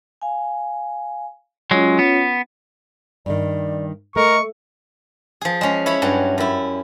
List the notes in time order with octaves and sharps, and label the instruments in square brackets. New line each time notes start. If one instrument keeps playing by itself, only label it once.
[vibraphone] F5 G#5
[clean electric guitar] F#3 G#3 [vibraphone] C#4 F4 C#5
[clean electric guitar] B3
[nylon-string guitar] G2 D#3 [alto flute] D5
[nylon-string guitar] A3 [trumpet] A#4 [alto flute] D#5 [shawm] C#6
[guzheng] F3 G#4
G#3 C#4
E4 C#5 B5
G2 F#3 C#4
F#2 E4